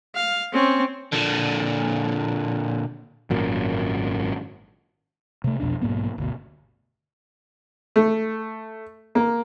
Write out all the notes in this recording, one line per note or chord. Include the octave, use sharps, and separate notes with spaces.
F5
C4 C#4
A#2 D3
G#1 F#2 A#2
C3 A3
B1 F2 B2 D4
B1 G#2 A#3 B3
G1 D2 B2
A3
A#3